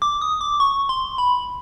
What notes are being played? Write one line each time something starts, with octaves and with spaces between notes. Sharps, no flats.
D6
D#6
D6
C#6
C6
B5